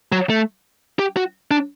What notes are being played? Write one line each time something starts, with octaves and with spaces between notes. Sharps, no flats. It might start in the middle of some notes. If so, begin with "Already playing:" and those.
F#3
A3
G4
F#4
D4